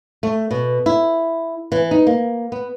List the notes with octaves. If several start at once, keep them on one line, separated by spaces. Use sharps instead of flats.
A3
B2
E4
E3
D#4
A#3
B3